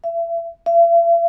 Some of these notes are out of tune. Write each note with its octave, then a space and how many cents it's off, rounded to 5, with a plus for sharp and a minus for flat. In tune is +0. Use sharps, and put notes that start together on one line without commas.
E5 +35
E5 +45